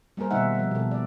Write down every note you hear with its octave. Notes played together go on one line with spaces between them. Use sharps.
G3 A#3 G#4 A#4 C5
B2 D#3 G3 D#4 E5 F#5
F3 G3
B2 A4
D5